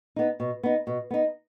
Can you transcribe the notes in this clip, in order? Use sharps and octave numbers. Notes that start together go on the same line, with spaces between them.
B3 D#4
B2
B3 D#4
B2
B3 D#4